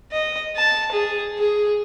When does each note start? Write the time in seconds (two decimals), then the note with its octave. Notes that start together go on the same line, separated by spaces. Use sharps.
0.12 D#5
0.56 A5
0.92 G#4
1.38 G#4